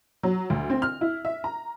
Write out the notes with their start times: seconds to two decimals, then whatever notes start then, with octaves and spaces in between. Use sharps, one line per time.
0.23 F#3
0.50 D2
0.70 C4
0.82 F6
1.01 E4
1.25 E5
1.44 A#5